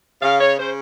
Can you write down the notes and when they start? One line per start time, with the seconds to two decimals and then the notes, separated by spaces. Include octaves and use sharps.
0.22 C#3 F5
0.40 C#5
0.58 C#3 C5